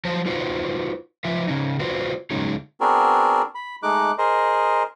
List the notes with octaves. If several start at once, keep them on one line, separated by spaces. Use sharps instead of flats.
F3 F#3 C5 A5
D#4 F4 F#4 B4 C5 D5
F3 F4 B4 E5
C#3 C#4 D#4
F4 F#4 B4 C5 D5
C#3 F#3 G#3 C#4 D#4 G#4
B3 C4 D4 F#4 G#4 A#4
B5
G#3 A3 D#4 D6 F#6
G#4 A#4 C5 D#5